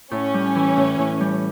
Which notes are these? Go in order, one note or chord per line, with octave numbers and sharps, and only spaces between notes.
A2 C#4
G3
E3
A2
A2
G3